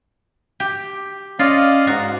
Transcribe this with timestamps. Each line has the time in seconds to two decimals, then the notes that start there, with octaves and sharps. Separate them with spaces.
0.60 G4
1.39 C#4 F4 D5 D#5 F5
1.87 G#2 F#4